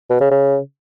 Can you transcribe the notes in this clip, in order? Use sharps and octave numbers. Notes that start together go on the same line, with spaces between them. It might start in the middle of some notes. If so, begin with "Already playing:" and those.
B2
C#3
C#3